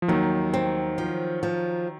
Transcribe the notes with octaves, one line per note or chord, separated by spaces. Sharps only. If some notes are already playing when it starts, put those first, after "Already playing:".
F3
D#2 D#3 F#3
C4
F3
F3